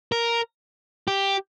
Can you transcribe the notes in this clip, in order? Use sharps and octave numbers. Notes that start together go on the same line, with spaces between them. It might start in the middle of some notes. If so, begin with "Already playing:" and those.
A#4
G4